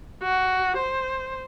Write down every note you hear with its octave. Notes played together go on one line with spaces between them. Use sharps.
F#4
C5